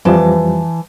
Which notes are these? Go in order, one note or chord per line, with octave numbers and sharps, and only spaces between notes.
F2 E3 F3 G3 A5